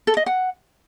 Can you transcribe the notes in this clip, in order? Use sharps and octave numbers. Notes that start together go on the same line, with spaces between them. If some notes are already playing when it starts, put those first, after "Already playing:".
A4
D#5
F#5